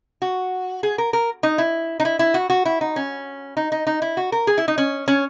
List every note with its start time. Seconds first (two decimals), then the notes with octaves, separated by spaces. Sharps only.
0.22 F#4
0.83 G#4
0.98 A#4
1.13 A#4
1.43 D#4
1.58 E4
2.00 D#4
2.05 E4
2.19 E4
2.34 F#4
2.50 F#4
2.65 E4
2.81 D#4
2.96 C#4
3.57 D#4
3.72 D#4
3.87 D#4
4.02 E4
4.17 F#4
4.32 A#4
4.47 G#4
4.58 E4
4.68 D#4
4.78 C#4
5.08 C#4